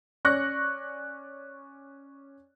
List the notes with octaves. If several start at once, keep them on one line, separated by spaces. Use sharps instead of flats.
C#4 C#5 D5 C#6 F#6 A#6